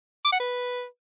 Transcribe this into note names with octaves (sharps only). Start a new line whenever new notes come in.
D6
F#5
B4